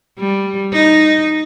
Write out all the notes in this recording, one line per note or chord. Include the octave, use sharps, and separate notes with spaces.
G3
D#4